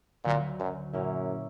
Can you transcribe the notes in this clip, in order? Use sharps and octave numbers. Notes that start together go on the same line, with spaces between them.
D2 A#2 D3 F#3
F#2
F#2 A#2 A#3 C#4 E4